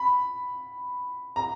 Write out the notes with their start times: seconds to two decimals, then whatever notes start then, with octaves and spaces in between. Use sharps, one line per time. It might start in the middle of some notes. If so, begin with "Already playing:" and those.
Already playing: B5
1.36 A#5